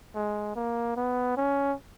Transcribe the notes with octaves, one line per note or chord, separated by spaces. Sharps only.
G#3
A#3
B3
C#4